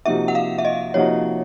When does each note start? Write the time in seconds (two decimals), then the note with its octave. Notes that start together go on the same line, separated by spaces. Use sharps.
0.06 C3 F3 A#3 D#4 F#4 E5
0.28 F#5
0.35 F5
0.58 E5
0.65 D#5
0.94 C3 F3 A#3 D#4 F#4 C#5